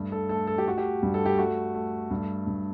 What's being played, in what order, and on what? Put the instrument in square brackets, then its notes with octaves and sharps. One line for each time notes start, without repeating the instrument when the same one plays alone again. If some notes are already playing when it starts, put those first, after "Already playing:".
Already playing: [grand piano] G2 A3
A4
A3 A4
A4
G4
A3 F#4
G4
G2
A4
G4
A3 F#4
A3
G2
G2